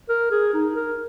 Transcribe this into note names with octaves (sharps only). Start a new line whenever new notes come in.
A#4
G#4
D#4
A#4